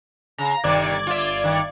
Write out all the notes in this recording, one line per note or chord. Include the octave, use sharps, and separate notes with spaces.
C#3 A#5
G1 C3 D#3 D5 G#6
F4 E5
D#3